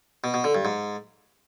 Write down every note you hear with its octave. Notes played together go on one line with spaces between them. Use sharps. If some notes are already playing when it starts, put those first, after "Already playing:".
B2
B2
D3
G2
G#2